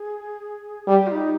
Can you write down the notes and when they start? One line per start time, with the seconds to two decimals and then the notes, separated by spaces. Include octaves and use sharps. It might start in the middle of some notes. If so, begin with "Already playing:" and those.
Already playing: G#4
0.87 G3 G4 G#4
1.07 F4
1.11 D#4